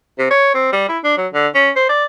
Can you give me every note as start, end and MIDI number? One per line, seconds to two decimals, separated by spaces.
0.19 0.26 48
0.31 0.51 73
0.54 0.70 60
0.72 0.86 55
0.89 0.98 64
1.04 1.15 62
1.17 1.27 54
1.33 1.47 50
1.55 1.71 61
1.76 1.89 72
1.89 2.05 74